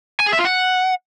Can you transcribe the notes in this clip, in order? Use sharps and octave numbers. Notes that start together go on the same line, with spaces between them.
G#5
G#4
E5
F4
F#5